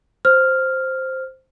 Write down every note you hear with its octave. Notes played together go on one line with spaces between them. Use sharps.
C5 F6